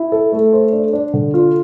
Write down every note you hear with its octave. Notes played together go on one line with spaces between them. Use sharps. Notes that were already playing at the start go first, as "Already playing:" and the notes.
Already playing: E4
A4
A3
C5
D4
D4
D3
F4